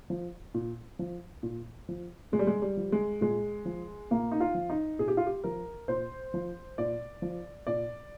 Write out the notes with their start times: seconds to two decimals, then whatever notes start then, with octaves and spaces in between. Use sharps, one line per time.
0.10 F3
0.54 A#2
0.99 F3
1.43 A#2
1.89 F3
2.32 A#2 G#3
2.39 G3
2.47 G#3
2.62 G3
2.77 F3
2.92 G#3
3.21 A#2 G#3
3.65 F3
4.10 A#2 A#3
4.32 D#4
4.40 F4
4.54 F3
4.70 D#4
4.99 A#2 G#4
5.08 G4
5.17 F4
5.26 G4
5.44 F3 A#4
5.88 A#2 C5
6.34 F3
6.78 A#2 D5
7.22 F3
7.67 A#2 D5